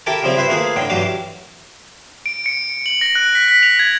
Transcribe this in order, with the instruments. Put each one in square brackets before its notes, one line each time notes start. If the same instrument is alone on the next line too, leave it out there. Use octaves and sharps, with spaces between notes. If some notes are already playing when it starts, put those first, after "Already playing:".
[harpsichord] E4 G4 A4 A#4 G5 A5
C#3 F3 G3 C4 E4
E4 F4 B4 C5 E5
A3 A#3 F4 G#4 B4
A2 D3 G5
G2 E3 F#3 G4 F5 D6
[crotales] D7
C#7
F#7
A#6
F#6
B6
B6
F7
G#6